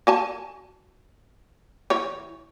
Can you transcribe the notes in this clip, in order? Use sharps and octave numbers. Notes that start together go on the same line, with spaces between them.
F#4 G#5 A5
E3 C#5